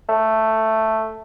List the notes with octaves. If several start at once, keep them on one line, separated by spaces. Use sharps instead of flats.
A3